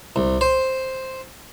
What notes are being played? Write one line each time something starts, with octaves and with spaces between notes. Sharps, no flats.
C2
C5